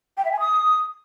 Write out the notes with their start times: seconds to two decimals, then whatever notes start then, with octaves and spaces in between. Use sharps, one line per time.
0.17 G5
0.25 E5
0.32 G#5
0.40 D#6